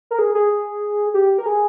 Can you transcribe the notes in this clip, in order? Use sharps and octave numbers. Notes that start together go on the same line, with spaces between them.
A#4
G#4
G#4
G4
A#4
G#4